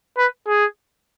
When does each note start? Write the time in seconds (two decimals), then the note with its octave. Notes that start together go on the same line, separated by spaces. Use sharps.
0.17 B4
0.47 G#4